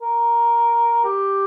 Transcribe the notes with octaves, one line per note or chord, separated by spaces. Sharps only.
A#4
G4